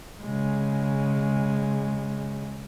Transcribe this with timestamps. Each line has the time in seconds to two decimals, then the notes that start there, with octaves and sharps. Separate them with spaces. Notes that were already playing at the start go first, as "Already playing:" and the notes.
0.22 C#3 G#3